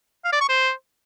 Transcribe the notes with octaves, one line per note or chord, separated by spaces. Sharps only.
F5
D5
C#6
C5